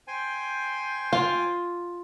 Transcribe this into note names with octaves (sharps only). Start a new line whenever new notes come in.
C5 G5 G#5
F4